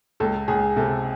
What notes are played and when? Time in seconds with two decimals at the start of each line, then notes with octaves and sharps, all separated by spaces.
0.20 C#2 A4
0.48 C#2 G#4
0.76 C3 A4